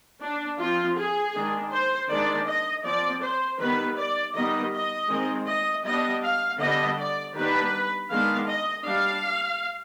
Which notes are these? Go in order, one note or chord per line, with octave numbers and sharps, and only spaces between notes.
D4
F3 C4 F4
G#4
D#3 G#3 D4
C5
D#3 G#3 D4 D5
D#5
F3 C4 D5
C5
D#3 G3 B3 B4
D5
D#3 G3 B3 D#5
D#5
D#3 G#3 C4
D#5
G3 B3 D4 D#5
F5
D3 G3 B3 D4 D#5
D5
D#3 G3 B3 D4 B4
D#3 G#3 B3 D4 F5
D#5
G3 D4 F5